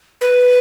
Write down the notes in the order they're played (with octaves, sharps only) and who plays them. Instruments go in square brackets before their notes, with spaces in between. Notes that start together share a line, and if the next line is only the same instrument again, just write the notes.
[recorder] B4